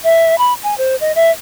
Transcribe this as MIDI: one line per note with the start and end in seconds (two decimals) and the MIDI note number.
0.04 0.38 76
0.38 0.53 83
0.63 0.76 80
0.78 0.96 72
1.00 1.12 75
1.15 1.31 76